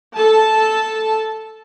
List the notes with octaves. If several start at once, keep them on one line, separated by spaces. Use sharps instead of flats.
A4 A5